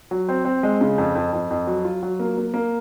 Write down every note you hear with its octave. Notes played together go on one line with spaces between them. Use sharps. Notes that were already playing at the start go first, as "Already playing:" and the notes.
F#3
C4
C4
G#3
C#3
F2
F2
F2
F2
F#3
F4
F#3
A#3
A#3
A#3